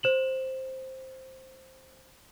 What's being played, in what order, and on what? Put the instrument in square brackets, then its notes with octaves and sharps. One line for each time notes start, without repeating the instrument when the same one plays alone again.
[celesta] C5 E7 F#7